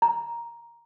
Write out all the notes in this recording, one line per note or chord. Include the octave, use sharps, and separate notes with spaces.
A#5